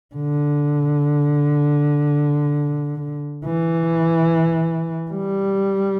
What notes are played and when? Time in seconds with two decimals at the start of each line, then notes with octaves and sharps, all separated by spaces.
0.15 D3
3.45 E3
5.10 G3